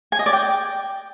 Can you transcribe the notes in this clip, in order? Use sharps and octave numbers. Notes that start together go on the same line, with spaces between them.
G#5
D#5
D5
G5